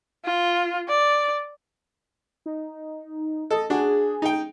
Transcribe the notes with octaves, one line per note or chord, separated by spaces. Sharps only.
F4
D5
D#4
A4 D#5
D4 F#4 G#4
D#4 G5